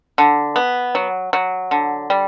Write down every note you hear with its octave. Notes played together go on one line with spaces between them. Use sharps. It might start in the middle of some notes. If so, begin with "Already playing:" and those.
D3
B3
F#3
F#3
D3
G3